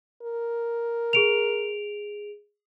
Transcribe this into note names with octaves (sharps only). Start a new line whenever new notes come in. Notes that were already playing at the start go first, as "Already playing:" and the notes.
A#4
G#4 D7 F7